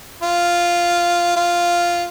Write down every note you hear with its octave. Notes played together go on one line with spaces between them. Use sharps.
F4
F4